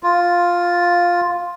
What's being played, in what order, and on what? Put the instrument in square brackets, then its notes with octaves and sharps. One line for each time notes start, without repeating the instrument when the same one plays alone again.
[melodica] F4